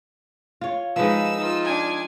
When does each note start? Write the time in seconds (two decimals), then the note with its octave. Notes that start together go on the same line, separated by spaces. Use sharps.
0.61 F4 C#5
0.96 F3 G#3 D#4 B4 E6
1.37 D#4 F4
1.65 D4 G#5